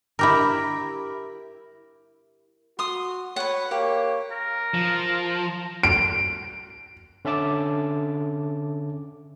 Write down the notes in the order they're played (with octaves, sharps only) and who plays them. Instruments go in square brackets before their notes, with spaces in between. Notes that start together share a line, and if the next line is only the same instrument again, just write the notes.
[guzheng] E4 G4 A#4
[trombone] F#4 [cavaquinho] C6 D#6
[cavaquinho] B4 F#5 [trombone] C#5
[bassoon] A#3 [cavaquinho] G4 [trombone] C#5
[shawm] A#4
[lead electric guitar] F3
[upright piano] D7
[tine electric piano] D3 C#4 E5 A5 D6